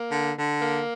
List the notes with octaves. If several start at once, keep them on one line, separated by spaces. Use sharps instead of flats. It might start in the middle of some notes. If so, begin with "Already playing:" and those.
Already playing: A#3
D3
D3
A#3